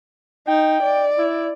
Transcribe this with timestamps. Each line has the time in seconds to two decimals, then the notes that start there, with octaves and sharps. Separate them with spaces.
0.48 D#4 G5
0.83 D5
1.19 E4